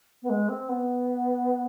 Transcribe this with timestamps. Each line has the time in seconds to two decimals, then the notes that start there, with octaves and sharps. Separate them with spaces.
0.22 B3
0.30 G#3
0.49 C4
0.69 B3